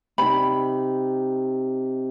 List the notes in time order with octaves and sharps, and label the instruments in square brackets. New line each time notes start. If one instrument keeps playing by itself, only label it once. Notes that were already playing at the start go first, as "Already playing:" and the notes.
[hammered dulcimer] C3 D#4 [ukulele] B5